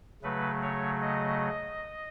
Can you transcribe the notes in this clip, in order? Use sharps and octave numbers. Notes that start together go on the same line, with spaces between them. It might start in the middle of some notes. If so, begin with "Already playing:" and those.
C#3 F#3 A3 B4
C#5
D#5